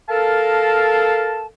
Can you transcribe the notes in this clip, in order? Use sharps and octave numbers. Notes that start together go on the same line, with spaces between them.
A4 A#4 F5 A5